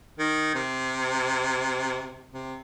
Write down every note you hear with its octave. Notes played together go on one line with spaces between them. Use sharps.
D#3
C3
C3